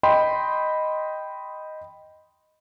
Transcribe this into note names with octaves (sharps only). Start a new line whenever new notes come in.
D#5 G5 B5 C6